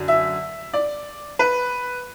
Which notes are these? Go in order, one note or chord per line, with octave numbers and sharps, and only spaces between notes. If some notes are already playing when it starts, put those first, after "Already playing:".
Already playing: F#2 D3
E5
D5
B4